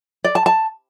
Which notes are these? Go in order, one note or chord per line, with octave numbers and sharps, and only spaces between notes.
D5
A5
A5